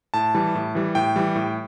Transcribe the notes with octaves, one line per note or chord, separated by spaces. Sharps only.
A2 A5
E3 G3
A2
E3 G3
A2 G5
E3 G3
A2